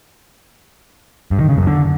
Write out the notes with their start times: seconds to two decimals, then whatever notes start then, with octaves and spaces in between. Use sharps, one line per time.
1.31 G2
1.40 D#3
1.49 C#3
1.58 F#2
1.66 D3